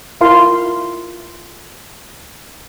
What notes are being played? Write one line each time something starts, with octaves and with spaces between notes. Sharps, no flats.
E4 F4 A#4 F5 C6